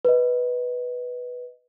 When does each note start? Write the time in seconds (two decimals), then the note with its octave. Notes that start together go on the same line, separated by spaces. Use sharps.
0.05 B4 D#5